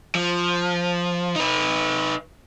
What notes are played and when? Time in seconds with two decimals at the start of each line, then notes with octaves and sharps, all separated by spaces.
0.15 F3
1.36 D#4 B4